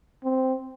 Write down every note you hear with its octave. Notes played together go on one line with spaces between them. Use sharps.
C4